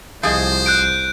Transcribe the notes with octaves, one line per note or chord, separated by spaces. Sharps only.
C2 F3 G#4 C5 D#5
F#6 G6 D7